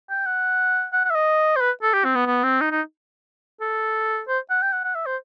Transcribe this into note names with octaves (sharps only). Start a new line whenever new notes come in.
G5
F#5
F#5
F#5
E5
D#5
C5
B4
A4
G4
C4
B3
B3
C4
D#4
D#4
A4
C5
F#5
G5
F#5
F#5
E5
C5